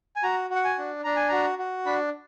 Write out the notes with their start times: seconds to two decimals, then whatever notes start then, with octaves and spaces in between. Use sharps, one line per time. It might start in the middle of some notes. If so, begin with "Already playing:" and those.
0.16 G#5
0.23 F#4 A#5
0.50 F#4
0.56 F#5
0.65 G#5
0.78 D4
1.04 D4 A#5
1.16 G#5
1.29 F#4 A#5
1.59 F#4
1.86 D4 B5